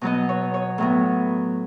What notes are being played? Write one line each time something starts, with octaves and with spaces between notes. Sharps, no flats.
B2 F#3 B3 D#5
C#5
C#5
A2 F#3 B3